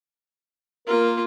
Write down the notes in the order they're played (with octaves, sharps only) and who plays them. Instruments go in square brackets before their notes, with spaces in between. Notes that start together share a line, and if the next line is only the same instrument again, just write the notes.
[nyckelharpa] A#3 F4 [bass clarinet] A#4